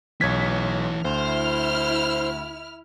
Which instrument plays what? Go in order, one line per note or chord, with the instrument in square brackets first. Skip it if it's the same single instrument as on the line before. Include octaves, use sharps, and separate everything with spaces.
[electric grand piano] B1 G#6 B6 [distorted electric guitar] E3 C#5
[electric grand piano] D2 [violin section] E4 F6 [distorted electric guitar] C5